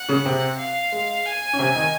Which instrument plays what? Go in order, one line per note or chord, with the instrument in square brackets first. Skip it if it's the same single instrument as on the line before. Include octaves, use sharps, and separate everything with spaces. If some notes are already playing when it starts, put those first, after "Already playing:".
Already playing: [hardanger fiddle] F#5
[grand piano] C#3 C#4
C3 C4
[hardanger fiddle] F5
[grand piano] G#3
[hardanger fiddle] G#5
[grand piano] C#4
C3 C4
D#3 D#4